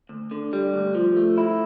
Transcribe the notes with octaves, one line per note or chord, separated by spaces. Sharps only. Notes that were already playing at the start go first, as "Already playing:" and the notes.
D2
D3
G3
D2
F3
A3
E4